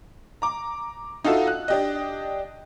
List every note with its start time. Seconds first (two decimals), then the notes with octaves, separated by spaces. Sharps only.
0.42 A#5 D6
1.24 D#4 F4 F#4 A4 E5
1.48 F#6
1.68 D4 G4 D#5